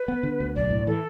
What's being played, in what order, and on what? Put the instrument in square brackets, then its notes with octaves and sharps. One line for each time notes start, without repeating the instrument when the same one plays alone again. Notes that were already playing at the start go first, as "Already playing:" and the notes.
Already playing: [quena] B4
[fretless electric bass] B3
D3
D2
[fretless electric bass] B1 [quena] D5
[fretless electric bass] A2
[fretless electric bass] E3 [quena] A4